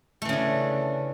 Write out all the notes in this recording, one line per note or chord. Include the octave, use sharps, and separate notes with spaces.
C#3 E3 A3 D4